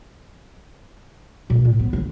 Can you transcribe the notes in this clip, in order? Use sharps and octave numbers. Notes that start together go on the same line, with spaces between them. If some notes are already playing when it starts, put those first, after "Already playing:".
A#2
A2
B3
D3